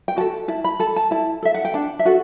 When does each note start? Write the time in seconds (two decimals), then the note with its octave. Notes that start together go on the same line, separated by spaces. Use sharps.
0.08 G5
0.16 F#4 A4 A5
0.48 E4 A5
0.64 B5
0.80 A4 A5
0.96 A5
1.11 E4 A5
1.43 A4 E5
1.54 F#5
1.65 G5
1.74 D4 A5
1.99 E5
2.05 F#4 A4 F#5